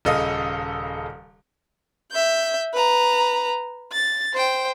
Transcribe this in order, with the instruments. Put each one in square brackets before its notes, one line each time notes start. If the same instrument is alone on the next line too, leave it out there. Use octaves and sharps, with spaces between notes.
[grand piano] D#1 C#3 A4 D#5 F5 D#6
[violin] E5 G6
B4 A#5
A6
C5 G5